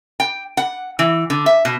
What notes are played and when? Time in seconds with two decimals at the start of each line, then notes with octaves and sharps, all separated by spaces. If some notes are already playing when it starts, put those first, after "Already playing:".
0.20 G5
0.57 F#5
0.99 E3
1.30 D3
1.46 E5
1.65 B2